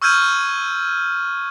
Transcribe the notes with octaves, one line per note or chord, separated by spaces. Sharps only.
C#6 E6 F6 G6 G#6 D#7